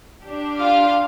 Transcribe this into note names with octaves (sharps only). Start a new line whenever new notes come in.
D4 G4
F4 F5